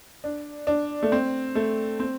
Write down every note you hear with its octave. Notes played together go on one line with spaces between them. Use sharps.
D4
D4
A3
C4
A3
C4